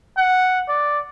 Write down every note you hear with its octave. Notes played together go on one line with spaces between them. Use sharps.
F#5
D5